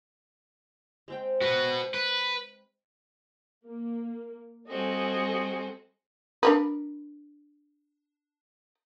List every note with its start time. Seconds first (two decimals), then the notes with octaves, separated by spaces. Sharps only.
1.08 G#3 C4 G5
1.41 F#4 B4
1.94 B4
3.66 A#3
4.69 G3 C4 F#4 A4 D#5 G#5
6.43 D4 A#4 B4